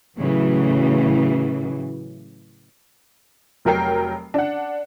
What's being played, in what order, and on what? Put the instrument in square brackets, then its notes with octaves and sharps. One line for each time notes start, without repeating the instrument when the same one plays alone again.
[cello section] A2 C#3 E3 F#3
[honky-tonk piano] F1 F#3 A#4 G5 C7
D4 F#5